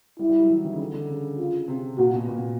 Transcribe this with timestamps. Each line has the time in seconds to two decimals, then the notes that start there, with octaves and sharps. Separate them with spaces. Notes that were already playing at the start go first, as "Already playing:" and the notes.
0.19 G3 E4
0.29 G3
0.40 F#3
0.50 E3
0.64 D#3
0.72 C#3
0.79 D3
0.94 D3
1.09 C#3
1.38 F4
1.68 C3
1.98 A#2 F#4
2.14 B2
2.28 A#2
2.38 B2